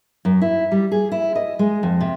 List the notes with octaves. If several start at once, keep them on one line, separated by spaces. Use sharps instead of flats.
F#2
E4
G3
G#4
E4
D#5
G#3
F2
C3